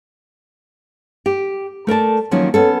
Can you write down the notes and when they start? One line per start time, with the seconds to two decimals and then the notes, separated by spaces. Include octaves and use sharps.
1.26 G4
1.87 A3 A#4 D5 A5
2.31 D#3 F3 F#3 A#3 C#4
2.54 B3 C#4 A4